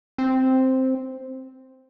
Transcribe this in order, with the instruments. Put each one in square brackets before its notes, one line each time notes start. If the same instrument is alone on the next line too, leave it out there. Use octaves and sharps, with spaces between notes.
[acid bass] C4